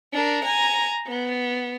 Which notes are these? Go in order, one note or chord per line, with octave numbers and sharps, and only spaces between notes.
D4 A#4
G#5 A#5
B3